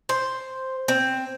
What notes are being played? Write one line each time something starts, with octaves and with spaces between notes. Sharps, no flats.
C5
C4